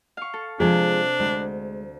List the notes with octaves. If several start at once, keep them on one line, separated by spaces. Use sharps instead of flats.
F5 C#6
A4
C3 F3 G#3 D4 G#4
D2 G#3